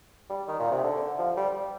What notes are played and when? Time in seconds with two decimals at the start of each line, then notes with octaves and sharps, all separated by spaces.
0.30 G3
0.48 D#3
0.60 A#2
0.72 C3
0.84 D3
1.19 F3
1.37 G3